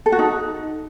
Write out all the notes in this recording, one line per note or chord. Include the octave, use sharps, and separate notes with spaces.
A4
F#4
D#4